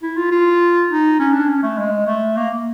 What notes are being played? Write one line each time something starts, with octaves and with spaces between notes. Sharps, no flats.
E4
F4
F4
D#4
C#4
D4
C#4
A3
G#3
A3
A#3